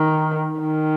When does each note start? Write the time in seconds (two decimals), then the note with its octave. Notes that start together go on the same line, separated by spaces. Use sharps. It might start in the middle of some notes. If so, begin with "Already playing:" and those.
Already playing: D#3
0.60 D#3